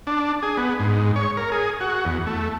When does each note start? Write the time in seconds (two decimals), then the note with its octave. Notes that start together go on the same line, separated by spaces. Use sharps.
0.07 D4
0.43 G#4
0.57 B3
0.80 G#2
1.16 C#5
1.37 A#4
1.52 G#4
1.80 F#4
2.05 E2
2.27 A3